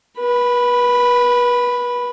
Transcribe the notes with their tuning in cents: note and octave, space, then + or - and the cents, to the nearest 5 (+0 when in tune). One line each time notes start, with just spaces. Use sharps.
B4 -35 B5 +0